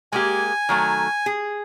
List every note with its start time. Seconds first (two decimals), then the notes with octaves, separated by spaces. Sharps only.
0.13 G#3 A#3 G4 G#5
0.69 D#3 F#3 A3
1.26 G#4